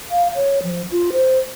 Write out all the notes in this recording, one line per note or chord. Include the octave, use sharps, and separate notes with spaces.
F5
C#5
F3
F4
C5